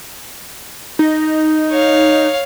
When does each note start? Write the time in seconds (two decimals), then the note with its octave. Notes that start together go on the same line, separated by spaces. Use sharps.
0.99 D#4
1.70 C#5 F5